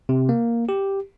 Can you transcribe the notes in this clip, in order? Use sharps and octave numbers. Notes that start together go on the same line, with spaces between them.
C3
A#3
G4